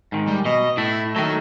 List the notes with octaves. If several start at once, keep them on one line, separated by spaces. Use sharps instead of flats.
G#2 D#3
G3
B2 D#5
A2 A3 E4
D#3 F#3 A4 E5